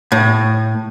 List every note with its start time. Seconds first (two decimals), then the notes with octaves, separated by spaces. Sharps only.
0.12 A2